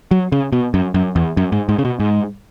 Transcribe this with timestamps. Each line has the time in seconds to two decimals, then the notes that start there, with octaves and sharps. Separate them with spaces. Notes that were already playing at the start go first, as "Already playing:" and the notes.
0.11 F#3
0.32 C#3
0.52 B2
0.74 F#2
0.94 F#2
1.16 E2
1.37 F#2
1.52 G#2
1.69 G#2
1.79 C#3
1.85 B2
2.00 G#2